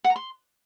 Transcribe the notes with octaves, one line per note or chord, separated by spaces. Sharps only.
F#5
A#5
C6